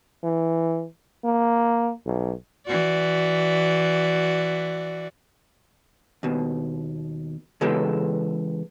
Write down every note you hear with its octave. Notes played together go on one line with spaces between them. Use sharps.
E3
A#3
B1
E3 F#4 D5
D#2 B2
C#3 E3 G#3 B3 G4 A4